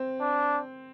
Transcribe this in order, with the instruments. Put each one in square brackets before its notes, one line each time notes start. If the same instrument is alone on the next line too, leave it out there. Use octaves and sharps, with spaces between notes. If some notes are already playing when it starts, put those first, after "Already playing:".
Already playing: [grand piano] C4
[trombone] D4